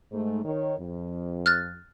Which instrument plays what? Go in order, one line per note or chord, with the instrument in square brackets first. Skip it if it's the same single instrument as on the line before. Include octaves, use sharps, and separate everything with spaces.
[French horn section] G#2 A3
D#3 C#5
F2
[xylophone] F6 F#6 A6